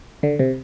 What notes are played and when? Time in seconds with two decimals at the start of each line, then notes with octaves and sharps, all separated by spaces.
0.23 D3
0.39 C3